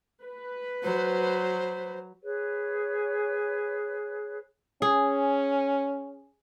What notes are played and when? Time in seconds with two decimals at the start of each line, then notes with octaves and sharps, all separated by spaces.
0.24 B4
0.83 F#3 C5
2.23 G#4 B4 C#5
4.82 C#4 G#4